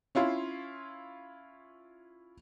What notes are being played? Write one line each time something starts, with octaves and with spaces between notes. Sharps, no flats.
C#4 E4 F4 C6